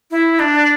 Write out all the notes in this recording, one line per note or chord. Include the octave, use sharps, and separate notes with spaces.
E4
D4